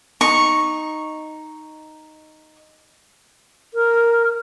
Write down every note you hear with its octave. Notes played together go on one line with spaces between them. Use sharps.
D#4 C#6
A#4